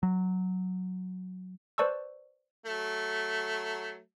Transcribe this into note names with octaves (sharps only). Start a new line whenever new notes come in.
F#3
B4 C5 D5 A5 C#6 E6
F#3 A3